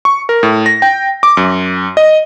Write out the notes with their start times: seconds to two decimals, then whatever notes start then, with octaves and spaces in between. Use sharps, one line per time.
0.05 C#6
0.29 A#4
0.43 A2
0.66 A#6
0.82 G5
1.23 D6
1.37 F#2
1.97 D#5